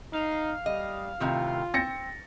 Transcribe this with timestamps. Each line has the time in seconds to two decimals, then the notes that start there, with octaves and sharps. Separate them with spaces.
0.13 D#4 F5
0.66 G3 D#5
1.20 A2 C3 D#3 F4
1.74 C4 A6 A#6 C#7